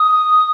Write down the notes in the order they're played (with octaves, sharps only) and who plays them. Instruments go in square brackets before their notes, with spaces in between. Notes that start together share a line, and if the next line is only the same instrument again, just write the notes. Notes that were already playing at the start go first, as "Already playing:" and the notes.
Already playing: [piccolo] D#6